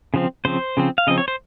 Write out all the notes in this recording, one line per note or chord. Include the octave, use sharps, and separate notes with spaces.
C#3 F3 C4
C#3 F3 C4 C5
C#3 F3 C4
F5
C#3 F3 C4 D#5
C#5
C5